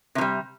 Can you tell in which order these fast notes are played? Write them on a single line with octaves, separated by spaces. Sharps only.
C3 A2 G3